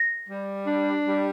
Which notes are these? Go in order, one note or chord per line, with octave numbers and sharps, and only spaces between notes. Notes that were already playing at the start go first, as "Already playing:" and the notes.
Already playing: A#6
G3
D4
G3